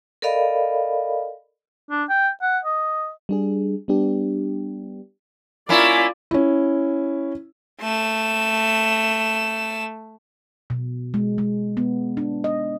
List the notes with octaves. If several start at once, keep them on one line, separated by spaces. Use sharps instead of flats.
A4 A#4 D5 D#5 F5 B5
D4
G5
F#5
D#5
G3 D4 G#4
G3 B3 D4 G4
A#3 C#4 E4 F4 D5
C#4 E4
A3 E7
B2
G#3
G#3
B3
D4
D#5